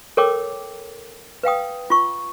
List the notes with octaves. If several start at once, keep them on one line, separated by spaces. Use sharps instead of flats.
A4 A#4 C#5 G5 D6 E6
B4 F5 G5 D#6
F4 C#6